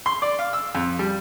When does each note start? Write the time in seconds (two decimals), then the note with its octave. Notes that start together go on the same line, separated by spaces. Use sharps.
0.06 C6
0.22 D5
0.39 F5
0.53 E6
0.75 F2
0.99 G3